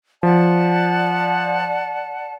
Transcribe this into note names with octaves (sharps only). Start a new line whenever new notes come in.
F3 D5 F#5 A5